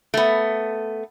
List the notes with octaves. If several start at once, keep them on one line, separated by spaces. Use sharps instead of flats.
A3 B3